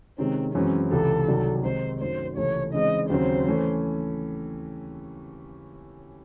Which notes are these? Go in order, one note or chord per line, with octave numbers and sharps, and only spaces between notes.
C3 D#3 G#3 C4 C#4
F#2 E3 G#3 C4 C#4
C#2 C3 E3 A4
C2 C3 D#3 F#3
C3 D#3 G#3 C4 D#4 C5
F#2 D#3 F#3 A3 C5
C#2 C3 E3 A3 C#5
C#3 E3 G#3 C4 D#4 D#5
D#2 C#3 F#3 C4 C5
E3 A3 C#4